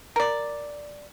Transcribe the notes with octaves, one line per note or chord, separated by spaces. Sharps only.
A#4 D5